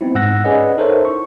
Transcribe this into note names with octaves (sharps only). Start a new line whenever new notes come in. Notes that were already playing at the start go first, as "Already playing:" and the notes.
B3 C4 D#4 E4
G#2 F#5 E6 F#6 A#6
C#4 G#4 B4 D5 D#5 F#5
D#4 A4 A#4 C5 C#5 E5
E4 C#6